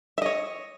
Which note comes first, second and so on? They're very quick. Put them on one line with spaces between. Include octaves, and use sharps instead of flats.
E5 D#5 C#5